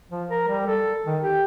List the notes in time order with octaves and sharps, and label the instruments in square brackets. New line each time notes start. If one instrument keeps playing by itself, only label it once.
[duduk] F3
A#4
G3
A4
D#3
G4